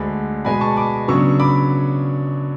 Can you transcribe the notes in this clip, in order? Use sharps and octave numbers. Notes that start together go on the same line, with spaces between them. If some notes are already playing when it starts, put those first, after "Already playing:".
Already playing: D2 D3 G#3 B5
B2 G#3 B3 G#5 B5
A5 C#6
B5 D6
C#3 F#3 B3 D4 C#6 E6
B5 D6